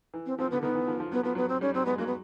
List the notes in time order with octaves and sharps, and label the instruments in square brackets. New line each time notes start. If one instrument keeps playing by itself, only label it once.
[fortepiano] E3
[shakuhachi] C4
[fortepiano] F3 [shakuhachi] C4
[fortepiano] D3 [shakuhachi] B3
[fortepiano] D#3 [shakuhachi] B3
[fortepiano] E3
F3
F3
[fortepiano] F#3 [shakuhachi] B3
[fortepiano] F3 [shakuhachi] B3
[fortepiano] F#3 [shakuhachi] B3
[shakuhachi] C4
[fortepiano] G3 [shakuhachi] C#4
[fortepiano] F#3 [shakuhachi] C4
[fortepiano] G#3 [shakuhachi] B3
[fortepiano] F#3 [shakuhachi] A#3
[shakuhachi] B3